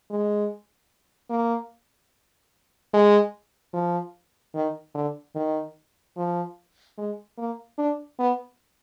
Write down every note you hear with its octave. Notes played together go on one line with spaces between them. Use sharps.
G#3
A#3
G#3
F3
D#3
D3
D#3
F3
G#3
A#3
D4
B3